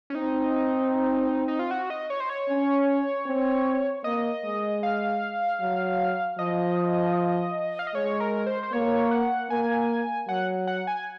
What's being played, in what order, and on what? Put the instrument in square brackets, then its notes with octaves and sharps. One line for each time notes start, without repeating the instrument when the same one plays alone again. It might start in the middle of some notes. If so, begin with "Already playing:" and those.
[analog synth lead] C#4
[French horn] C4 [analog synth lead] D#4
[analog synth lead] D#4
F4
F#4
D#5
C#5
C5
C#5
[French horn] C#4
C4
[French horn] A#3 [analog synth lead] D#5
[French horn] G#3
[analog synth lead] F5
[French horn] F#3
[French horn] F3 [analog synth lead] D#5
[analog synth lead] F5
D#5
[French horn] G#3 [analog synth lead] C#5
[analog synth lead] A#4
C5
C5
[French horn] A#3 [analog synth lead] C#5
[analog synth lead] F#5
[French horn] A#3 [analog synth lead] G#5
[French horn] F#3 [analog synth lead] F#5
[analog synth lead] F#5
G#5